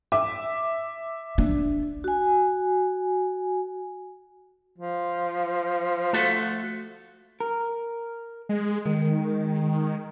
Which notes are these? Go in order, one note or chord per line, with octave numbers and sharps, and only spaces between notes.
E5 D6
D4
F#4 G#5
F3
A3 F#4 A4
A#4
G#3
D#3 G#3